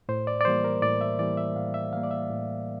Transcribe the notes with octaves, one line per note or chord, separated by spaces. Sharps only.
A2 C5
D5
D5
E3 G3 A#3 C5
A#4
A2 D5
E5
E3 G3 A#3 D5
E5
A2 F5
E5
E3 G3 A#3 F5
D5
E5
A2